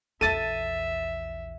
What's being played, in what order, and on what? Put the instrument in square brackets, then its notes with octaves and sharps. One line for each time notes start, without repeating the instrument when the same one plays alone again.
[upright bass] A#1 E2 [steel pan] A4 [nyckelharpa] E5 [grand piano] A6 D#7